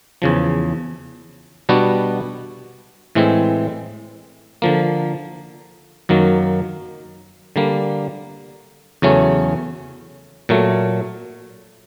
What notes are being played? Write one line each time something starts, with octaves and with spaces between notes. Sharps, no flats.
E2 C#3 F3
B2 G3 B3 D4 F#4
A2 E3 G#3 C4
D3 F3 A#3
F#2 D#3 F#3 A#3
D3 G3 A#3
E2 C#3 F#3 A3 C#4
A#2 F#3 A3